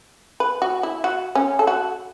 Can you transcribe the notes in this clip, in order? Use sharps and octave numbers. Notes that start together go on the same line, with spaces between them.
B4
F#4
E4
F#4
C#4
A4
F#4